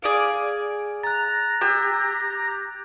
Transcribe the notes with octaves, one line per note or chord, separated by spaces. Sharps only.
G#4 D5 F5
A#5 F#6 A6
G4 E6